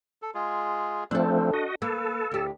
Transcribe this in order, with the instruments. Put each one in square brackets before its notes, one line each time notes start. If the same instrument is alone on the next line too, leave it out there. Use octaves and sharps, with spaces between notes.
[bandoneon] A4
G#3 F4 G#4
[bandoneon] C#3 E3 [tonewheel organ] F3 A3 C4 [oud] D4 A4
[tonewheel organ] F#4 D#5
[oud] A#3 [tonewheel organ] A4 [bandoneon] B4
[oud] D2 G4 [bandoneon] A2